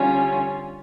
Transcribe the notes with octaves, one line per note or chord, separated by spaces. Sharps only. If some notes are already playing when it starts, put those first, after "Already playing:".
Already playing: D3 G3 C#4 F4